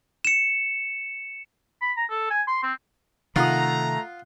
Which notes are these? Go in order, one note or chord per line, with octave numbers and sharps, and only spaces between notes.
C#7 E7
B5
A#5
A4
G#5
C6
C4
C3 D#3 A3 F4 F#5 A#5 D#6